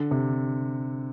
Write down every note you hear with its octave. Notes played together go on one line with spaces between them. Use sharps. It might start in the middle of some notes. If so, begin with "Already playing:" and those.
Already playing: D3
C3